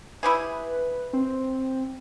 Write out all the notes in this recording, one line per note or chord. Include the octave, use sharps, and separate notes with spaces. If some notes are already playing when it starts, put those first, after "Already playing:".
E4 G4 G#4 B4
C4